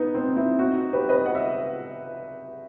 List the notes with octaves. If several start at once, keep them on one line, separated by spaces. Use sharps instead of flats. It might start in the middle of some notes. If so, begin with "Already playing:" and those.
Already playing: B3 D#4
C4
C4 E4
D#4 F#4
G4 B4
B4 D#5
F#5
E5